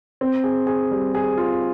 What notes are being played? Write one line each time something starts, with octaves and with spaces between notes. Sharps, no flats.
C4
G#4
G#4
G3
G#4
F4